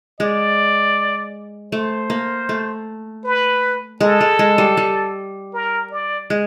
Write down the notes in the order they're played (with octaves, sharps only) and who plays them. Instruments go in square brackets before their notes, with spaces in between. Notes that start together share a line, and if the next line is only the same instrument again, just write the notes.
[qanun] G#3 [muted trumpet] D5
[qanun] A3 [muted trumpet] C5
[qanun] A#3
A3
[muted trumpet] B4
[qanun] G#3 [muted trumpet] A4
[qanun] G#3
G#3
G3
G3
[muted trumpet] A#4
D5
[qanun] G#3